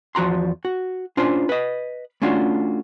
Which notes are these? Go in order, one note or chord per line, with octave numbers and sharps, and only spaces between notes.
E2 F3 F#4 A#5 C6
F#4
C#4 D4 F4 C5
B4 D#5
A3 C#4 D4 F4 F#4